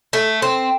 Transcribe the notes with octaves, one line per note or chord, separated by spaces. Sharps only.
A3
C4